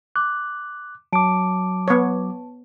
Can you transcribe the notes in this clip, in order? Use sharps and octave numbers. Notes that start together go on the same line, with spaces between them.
D6 F#6
F#3 A5 D6 D7
B3 C#5